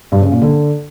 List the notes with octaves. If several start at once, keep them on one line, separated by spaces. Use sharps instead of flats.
G2
C#3
A#2
D3